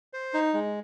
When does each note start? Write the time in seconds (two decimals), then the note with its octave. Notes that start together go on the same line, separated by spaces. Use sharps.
0.13 C5
0.34 D#4
0.54 G#3